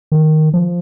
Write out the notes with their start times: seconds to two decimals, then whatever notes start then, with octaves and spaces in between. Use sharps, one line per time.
0.12 D#3
0.54 F3